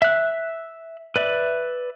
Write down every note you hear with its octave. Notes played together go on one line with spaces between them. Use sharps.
E5 F#6
B4 D5 E5